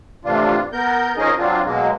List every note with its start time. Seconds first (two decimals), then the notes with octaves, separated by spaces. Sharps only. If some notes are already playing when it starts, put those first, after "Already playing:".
0.25 A2 C3 E3 D4 F4
0.73 B3 A#4 G6
1.17 F3 C#4 D#4 G#4 A#4 D#5
1.38 F#3 C4 D4 F4
1.65 B2 F#3 G#3 A#3